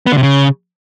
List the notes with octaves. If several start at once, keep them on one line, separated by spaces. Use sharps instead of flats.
B3
D3
C3
C#3